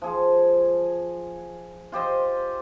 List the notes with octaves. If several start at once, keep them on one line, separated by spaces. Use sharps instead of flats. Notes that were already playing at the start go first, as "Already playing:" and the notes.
F3 G#4
F4 G4 C5 D#5